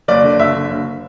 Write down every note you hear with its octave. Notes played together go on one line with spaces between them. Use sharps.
F#1 D5
D3
F#1 E5
D3
F#1